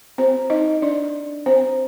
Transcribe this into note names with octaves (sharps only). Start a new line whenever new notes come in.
C4 C5
D#4 D#5
D4 D5
C4 C5